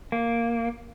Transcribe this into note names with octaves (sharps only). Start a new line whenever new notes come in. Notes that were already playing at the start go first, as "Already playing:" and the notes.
A#3